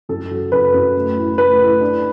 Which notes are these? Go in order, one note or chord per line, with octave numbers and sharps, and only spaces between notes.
F#2 A4
F#3
F#2 B4
F#2
A3
A2
A3 B4
A2
D4